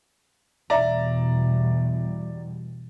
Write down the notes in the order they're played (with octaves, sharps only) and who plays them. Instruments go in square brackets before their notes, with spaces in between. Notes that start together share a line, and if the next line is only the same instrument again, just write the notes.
[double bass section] E2 B2 G3 [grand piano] D5 E5 A#5